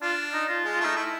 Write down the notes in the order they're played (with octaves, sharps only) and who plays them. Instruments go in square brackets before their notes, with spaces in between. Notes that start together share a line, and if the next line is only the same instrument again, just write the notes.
[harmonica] D4 [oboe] F4
[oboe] D#4
F4
[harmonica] G#3
[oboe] F4
[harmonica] A3 [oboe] D#4
[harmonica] A3 [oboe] E4